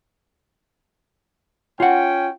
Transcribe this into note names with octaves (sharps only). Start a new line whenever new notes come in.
C#4 F4 F#5 G5